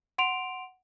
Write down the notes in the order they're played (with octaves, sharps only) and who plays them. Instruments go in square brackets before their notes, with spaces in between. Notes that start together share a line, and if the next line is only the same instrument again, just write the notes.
[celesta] F#5 C6 D7 F7